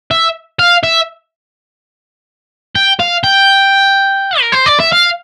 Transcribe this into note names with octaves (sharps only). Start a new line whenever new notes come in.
E5
F5
E5
G5
F5
G5
A#4
C5
D5
E5
F5